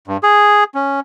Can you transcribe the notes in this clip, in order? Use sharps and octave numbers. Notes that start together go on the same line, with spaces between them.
G2
G#4
C#4